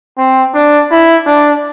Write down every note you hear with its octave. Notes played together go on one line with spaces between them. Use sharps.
C4
D4
E4
D4